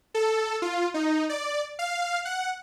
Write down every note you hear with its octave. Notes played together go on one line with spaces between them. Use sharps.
A4
F4
D#4
D5
F5
F#5